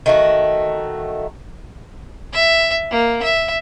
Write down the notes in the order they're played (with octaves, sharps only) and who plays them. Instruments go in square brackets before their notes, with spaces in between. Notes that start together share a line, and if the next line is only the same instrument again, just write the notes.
[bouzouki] D#3 A3 F#4
[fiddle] E5
A#3
E5